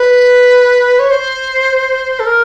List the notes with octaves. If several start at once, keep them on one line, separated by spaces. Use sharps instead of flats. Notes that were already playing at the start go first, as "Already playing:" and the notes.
Already playing: B4
C#5
C5
A4
A#4